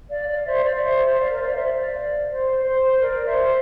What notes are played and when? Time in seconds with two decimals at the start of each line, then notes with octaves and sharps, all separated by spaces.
0.10 D5 F5
0.28 D5 F5
0.46 C5 E5
0.64 D5 F5
0.82 C5 E5
1.19 D5 F5
1.30 A#4
1.39 C5
1.47 D5
1.55 C5 E5
1.80 D5 F5
2.28 C5
2.64 C5
3.01 A#4 D5
3.25 C5 E5